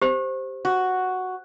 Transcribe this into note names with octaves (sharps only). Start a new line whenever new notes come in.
G4 C5
F#4